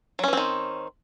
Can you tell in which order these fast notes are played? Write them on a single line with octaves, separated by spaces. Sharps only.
F#3 C#4 E3 C4 D#3